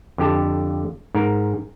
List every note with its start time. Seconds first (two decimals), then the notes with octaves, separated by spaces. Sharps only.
0.18 F2 D3 G4 A5
1.15 G#2 A#4